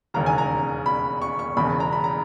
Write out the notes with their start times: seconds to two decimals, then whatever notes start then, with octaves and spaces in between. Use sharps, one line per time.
0.14 E1 D#2 C#3 A#5
0.26 G#5
0.38 A#5
0.86 B5
1.22 C#6
1.39 C#6
1.57 E1 E2 C#3 B5
1.80 A#5
1.92 B5
2.04 A#5